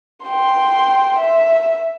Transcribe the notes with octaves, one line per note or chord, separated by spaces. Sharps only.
G5 C6
E5